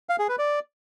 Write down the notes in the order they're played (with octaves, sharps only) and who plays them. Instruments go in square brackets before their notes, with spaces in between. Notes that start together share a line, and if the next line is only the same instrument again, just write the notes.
[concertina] F5
G#4
B4
D5